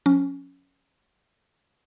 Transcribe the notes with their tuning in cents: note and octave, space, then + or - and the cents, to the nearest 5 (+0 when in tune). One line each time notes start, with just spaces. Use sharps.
F3 +45 C#4 +0